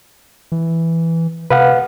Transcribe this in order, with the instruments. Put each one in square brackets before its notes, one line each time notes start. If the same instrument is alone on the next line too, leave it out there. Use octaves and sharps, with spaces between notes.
[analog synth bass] E3
[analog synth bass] C3 [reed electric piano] B4 F5 F#5